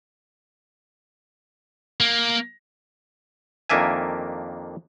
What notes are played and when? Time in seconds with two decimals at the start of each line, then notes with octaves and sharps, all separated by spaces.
2.00 A#3
3.70 F2 D#3 A#3 D4 E5 G#5